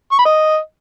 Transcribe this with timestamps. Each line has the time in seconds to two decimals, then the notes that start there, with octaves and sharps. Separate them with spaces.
0.12 C#6
0.19 B5
0.25 D#5